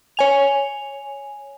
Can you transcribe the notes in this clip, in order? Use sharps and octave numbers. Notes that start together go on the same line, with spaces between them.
C#5 G#5 F7